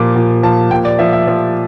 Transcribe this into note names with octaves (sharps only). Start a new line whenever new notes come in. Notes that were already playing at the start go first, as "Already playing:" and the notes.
Already playing: A#2 F3 D6
A#2
F3 A5
A#2 G5
D5
F3 E5
E5
F3